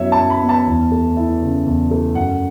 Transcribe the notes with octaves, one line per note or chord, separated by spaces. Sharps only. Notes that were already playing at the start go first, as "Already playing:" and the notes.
Already playing: F#2 F#3 B3 E4 C#5 E5
A5
F#2
B5
B3
A5
E2
A3
E4
C#3
E2
A3
F#2 F#5